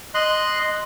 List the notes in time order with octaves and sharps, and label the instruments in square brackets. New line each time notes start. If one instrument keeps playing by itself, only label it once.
[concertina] D#5 C6 F#6